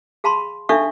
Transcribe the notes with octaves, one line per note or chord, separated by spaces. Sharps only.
G#4 F5 A5 B5 C6
D4 D#4 A4 E5 F5 C#6